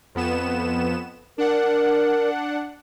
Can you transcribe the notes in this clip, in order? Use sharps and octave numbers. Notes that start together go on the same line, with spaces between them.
F2 B3 E7
D4 A#4 F#5